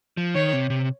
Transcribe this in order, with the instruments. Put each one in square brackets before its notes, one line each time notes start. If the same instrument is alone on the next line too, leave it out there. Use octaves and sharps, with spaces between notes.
[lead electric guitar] F3
[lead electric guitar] D#3 [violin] C#5
[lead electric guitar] C3
C3